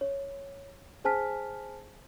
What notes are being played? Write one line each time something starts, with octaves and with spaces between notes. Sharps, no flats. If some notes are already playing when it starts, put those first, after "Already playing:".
C#5
G#4 C5 G#5 A5 F6 B6